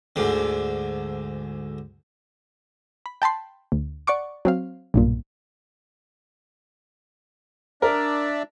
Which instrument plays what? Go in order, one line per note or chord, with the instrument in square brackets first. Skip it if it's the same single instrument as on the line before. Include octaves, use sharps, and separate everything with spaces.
[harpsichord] D2 G#2 D3
[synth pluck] B5
G5 A5 B5 C6
D2
D5 F#5 C#6 D6
F#3 C4 F5
B1 G2 A#2
[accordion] D4 D5 E5 [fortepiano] A#4